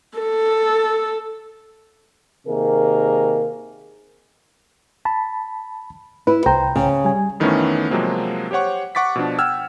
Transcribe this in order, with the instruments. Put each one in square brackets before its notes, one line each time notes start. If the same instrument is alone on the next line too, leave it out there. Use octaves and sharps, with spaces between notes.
[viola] A4
[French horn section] C3 D#3 A#3 G#4 A#4
[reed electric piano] A5 B5
[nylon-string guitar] E4 [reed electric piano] B4
[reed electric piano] C2 G5 A#5 [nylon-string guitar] C5
[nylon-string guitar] C#3
[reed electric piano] G3 G#5
[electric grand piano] F2 D#3 E3 A3 B3 C#4
C3 F3 F#3 G#3 A#3 C4
G4 C5 C#5 F#5 C#6
F#5 C#6 D6 A6 B6
B2 F3 D4
F#5 G5 E6 F6 G#6